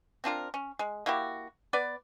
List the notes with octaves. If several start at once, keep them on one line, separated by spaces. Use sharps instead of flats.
C4 D4 F4 A#4
C#4
G#3
A#3 E4 F#4 G4
B3 B4 D5